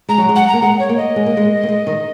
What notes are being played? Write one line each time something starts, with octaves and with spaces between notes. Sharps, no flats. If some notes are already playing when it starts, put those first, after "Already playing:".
G#3 A#5
F#3
G#3
F#5
A#5
A#3
G#3 F#5
C#5
A#3
D#5
G#3
A#3
G#3
A#3
G#3
D#3